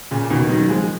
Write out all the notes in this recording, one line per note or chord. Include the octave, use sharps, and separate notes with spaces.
A#2 C#3
B2 D#3
D#3 F#3
F#3
F3 G#3